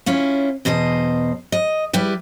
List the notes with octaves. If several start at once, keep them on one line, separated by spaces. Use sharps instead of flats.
C#4 E4 F4
E2 B2 C5 D#5
D#5
G3 E4 G4 B4